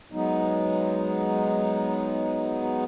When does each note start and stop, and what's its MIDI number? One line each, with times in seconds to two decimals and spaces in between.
0.12 2.85 54
0.12 2.85 56
0.12 2.85 59
0.12 2.85 63